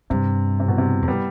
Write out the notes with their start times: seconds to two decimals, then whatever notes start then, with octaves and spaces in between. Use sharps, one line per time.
0.10 G2 C3
0.60 C3
0.68 B2
0.78 C3
1.02 E2
1.08 G3 B3